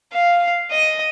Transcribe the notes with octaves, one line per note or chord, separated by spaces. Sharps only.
F5
D#5